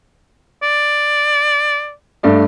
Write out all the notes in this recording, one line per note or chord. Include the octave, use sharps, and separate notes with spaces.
D5
G2 A3 D5